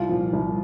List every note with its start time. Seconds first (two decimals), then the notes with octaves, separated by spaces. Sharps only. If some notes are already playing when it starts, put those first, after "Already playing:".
Already playing: C2 F4
0.09 A#2 F3
0.33 C2